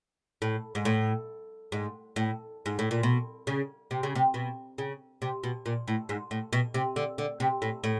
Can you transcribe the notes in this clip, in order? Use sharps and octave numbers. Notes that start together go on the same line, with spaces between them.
A2
G#2
A2
G#2
A2
G#2
A2
A#2
B2
C#3
C3
C#3
C3
B2
C#3
C3
B2
A#2
A2
G#2
A2
B2
C3
D3
D3
C3
A2
A2